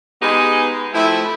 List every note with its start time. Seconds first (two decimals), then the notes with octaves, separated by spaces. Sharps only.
0.22 G#3 B3 D#4 G4 G#4
0.94 F3 A3 C4 E4